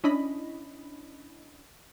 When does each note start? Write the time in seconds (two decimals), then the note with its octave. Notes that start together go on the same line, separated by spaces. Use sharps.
0.04 C#4 D4 E4 D#5 B5